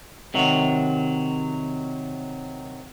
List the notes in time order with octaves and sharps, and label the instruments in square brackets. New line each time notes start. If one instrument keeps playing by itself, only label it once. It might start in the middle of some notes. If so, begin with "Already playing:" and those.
[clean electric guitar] C3 D#3 F#3